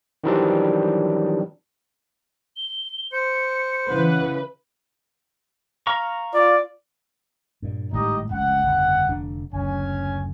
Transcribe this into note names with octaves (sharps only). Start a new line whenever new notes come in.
D#3 E3 F#3 G3 C4 D4
G7
C5 C#7
C#3 E3 B4 F#5
F5 A#5 C#6
F4 D5
G2 A#2
G#1 A2 G3 D#4 G4 D#5
F1 C#2 F#5
G1 F2 C#3
F1 D3 D4
F#1 D2 C#4 G#5